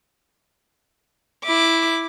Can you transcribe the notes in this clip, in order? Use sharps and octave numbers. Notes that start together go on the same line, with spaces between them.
E4 D6